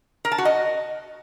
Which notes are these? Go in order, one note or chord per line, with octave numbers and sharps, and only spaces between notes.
A#4
A5
F#4
D#5